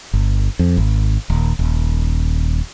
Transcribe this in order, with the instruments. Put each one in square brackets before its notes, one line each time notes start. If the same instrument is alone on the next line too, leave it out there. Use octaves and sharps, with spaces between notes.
[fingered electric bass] G1
F2
G#1
D#1
D#1